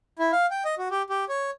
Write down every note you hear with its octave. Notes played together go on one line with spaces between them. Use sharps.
E4
F5
G5
D#5
F#4
G4
G4
C#5